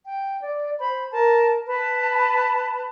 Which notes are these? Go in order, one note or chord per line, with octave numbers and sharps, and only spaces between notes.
G5
D5
C5 B5
A#4 A5
B4 A5 B5